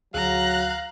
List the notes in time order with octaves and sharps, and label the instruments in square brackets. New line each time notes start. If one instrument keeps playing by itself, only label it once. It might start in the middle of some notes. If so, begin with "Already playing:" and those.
[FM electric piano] D2 G#4 [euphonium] F#3 [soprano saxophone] F5 [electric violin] A#5 F#6